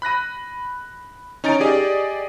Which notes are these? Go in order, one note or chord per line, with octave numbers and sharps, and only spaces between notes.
B5 F#6 A#6 D#7
C#4 D#4 A#5 A6 D7
G4 G#4 D5 D#5